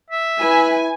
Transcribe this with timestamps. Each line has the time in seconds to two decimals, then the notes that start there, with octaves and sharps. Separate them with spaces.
0.10 E5
0.41 E4 B4 G#5